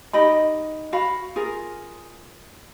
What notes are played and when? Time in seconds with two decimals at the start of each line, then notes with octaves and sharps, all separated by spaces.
0.13 D#4 G4 D#5 B5
0.93 F#4 F5 B5
1.36 F4 G#4 A#4